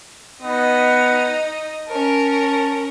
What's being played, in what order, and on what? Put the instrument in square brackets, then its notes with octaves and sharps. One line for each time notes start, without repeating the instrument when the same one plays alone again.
[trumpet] B3 [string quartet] D#4 D#5
[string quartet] C#4 A#4 [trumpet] A5